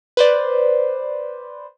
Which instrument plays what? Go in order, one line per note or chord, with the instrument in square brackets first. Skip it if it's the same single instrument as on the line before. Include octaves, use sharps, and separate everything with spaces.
[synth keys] B4 C5 D5